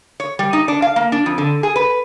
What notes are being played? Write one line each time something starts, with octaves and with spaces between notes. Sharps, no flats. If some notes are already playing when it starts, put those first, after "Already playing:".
C#5
G3
D#4
D4
F5
A#3
D4
F2
D3
G#4
B4